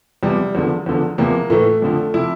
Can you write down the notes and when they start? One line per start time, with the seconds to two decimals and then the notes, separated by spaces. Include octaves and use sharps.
0.23 E2 C3 F3 G3
0.55 E2 D3 F3
0.86 E2 D3 F3
1.18 E2 C3 F3 A#3
1.50 A2 E3 A3
1.82 F2 D3 F3
2.14 C3 F3 E4